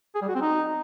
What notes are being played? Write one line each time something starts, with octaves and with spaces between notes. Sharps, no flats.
G#4
G3
F#4
C4
D#4